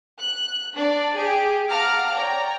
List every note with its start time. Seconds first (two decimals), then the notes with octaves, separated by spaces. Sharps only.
0.19 F#6
0.76 D4 D5
1.16 G4 G#4 D7
1.68 F5 F#5 A5 A#5 D6 F6
2.14 C#5 D5 G5 A#5